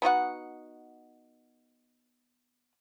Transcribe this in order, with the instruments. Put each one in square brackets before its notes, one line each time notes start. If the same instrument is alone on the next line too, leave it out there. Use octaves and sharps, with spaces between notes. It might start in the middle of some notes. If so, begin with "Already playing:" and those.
[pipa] B3 D#4 F#4 F#5